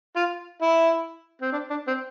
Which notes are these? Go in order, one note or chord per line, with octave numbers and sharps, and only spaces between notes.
F4
E4
C4
D4
D4
C4